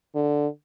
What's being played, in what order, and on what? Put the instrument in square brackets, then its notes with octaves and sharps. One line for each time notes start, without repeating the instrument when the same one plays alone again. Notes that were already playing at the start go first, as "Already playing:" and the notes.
[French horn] D3